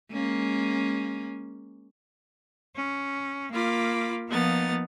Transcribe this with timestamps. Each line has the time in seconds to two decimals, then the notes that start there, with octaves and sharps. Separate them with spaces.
0.12 G#3 A#3 C#4
2.75 C#4
3.52 A#3 F4 B5 D6
4.27 F3 A#3 B3 D#4 A6